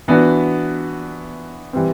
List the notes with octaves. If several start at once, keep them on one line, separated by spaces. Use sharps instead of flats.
E3 B3 D4 F#4
E3 G3 C4